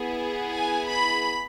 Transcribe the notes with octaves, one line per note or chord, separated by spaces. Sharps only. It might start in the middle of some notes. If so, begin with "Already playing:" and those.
Already playing: B3 E4 G#4
G#5
B5